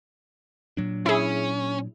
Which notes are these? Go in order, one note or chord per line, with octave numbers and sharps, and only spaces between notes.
A#2 F#3 D4
C#4 E4 G#4